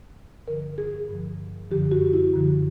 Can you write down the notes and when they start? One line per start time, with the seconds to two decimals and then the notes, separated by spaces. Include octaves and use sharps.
0.47 G2 D3 F3 A#4
0.78 G#4
1.09 G2 D3 F3
1.71 F#2 D3 F3 G4
1.92 F#4
2.13 E4
2.34 F#2 D3 F3